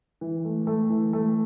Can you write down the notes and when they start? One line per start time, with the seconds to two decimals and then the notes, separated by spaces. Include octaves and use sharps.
0.21 E3
0.44 A3
0.67 A3
0.90 E3
1.13 A3